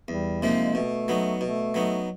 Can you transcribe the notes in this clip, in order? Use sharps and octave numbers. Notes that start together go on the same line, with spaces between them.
E2 G3
C3 F3 G#3 A#3 D#4
G#3
B2 A3
F#3 B3 D#4
B2 A3
F#3 B3 D#4